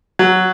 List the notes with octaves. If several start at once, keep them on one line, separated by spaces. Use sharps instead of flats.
F#3